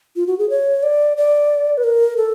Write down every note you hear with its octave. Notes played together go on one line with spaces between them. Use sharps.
F4
F#4
G#4
C#5
D5
D5
B4
A#4
A4